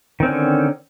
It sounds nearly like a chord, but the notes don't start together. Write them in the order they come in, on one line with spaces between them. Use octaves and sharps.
D#3 C4 C#4 D3